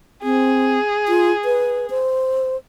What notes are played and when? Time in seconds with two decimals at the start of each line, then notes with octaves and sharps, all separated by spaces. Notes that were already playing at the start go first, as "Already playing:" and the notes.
0.23 C4 G#4
1.08 F4
1.45 B4
1.90 C5